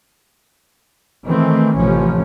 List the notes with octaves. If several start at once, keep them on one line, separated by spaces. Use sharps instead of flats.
D#3 E3 A3 C4
A1 C3 F3 C#4